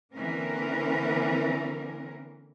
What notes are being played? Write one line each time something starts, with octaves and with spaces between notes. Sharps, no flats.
D3 E3 A#3 C4 C#4 A#4